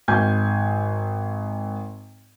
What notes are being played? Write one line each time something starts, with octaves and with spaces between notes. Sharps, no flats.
G#1 G#5 G6 G#6